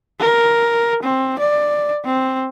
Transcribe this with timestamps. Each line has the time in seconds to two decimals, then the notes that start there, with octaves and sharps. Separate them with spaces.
0.20 A#4
1.03 C4
1.40 D5
2.05 C4